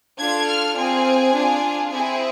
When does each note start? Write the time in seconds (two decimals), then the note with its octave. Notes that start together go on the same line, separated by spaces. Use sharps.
0.19 D4 F4 A4 G#6
0.48 F6
0.76 C4 F4 G#4 G#5
1.34 D4 F4 G#4
1.92 C4 E4 G#4 G#5